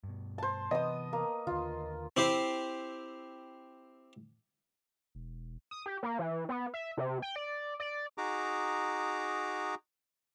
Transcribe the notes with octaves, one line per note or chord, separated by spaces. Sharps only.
G2 B2
C5 A5
C3 E3 B3 D#5 D#6
A#3
D#2 D3 F4
C4 E4 G4 C5
E1
D#6
G4
A#3
E3
B3
E5
C3
G5
D5
D5
D#4 F#4 G#4 A#5 D6